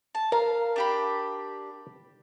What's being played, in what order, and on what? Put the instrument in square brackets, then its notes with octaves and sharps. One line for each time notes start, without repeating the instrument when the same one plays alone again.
[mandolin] A5
[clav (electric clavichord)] A#4 [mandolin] F5
[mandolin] D4 G4 B5